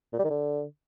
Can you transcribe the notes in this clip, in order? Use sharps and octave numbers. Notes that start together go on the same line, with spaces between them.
A#2
G3
D#3
D3